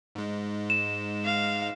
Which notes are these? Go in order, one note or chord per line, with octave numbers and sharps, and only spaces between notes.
G#2 G#3
E7
F5